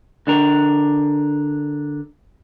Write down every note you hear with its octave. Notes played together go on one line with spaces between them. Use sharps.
D3 D4 A#4